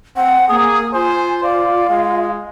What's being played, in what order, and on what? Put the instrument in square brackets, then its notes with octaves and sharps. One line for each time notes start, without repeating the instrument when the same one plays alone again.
[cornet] C4 [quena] F#5
[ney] A#3 [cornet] G#4 [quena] D#6
[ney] F4 [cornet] C5 [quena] G#5
[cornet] D5 [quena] F5
[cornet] G#3